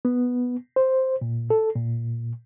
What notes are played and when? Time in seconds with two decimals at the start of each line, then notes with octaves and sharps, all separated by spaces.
0.05 B3
0.76 C5
1.21 A#2
1.50 A4
1.76 A#2